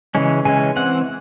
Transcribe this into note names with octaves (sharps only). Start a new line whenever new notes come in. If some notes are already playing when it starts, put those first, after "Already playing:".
C#3 E3 G#3 C#4
C#3 E3 G#3 C#4 G#5
E3 C4 F#5